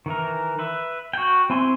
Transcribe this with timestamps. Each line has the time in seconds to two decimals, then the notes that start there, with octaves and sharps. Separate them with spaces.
0.06 D#3 E3 A#4
0.59 B4 E5
1.13 F#4 G5
1.50 C4 E4 G#5 C6